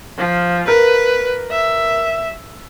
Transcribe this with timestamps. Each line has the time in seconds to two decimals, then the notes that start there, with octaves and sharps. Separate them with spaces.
0.18 F3
0.68 A#4 B4
1.51 E5